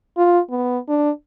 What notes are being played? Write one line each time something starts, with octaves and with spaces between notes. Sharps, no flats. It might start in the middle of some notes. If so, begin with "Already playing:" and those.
F4
B3
D4